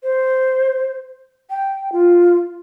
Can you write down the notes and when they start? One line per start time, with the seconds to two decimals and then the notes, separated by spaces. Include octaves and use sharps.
0.03 C5
1.50 G5
1.92 F4